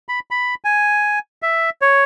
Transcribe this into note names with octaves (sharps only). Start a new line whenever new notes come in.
B5
B5
G#5
E5
C#5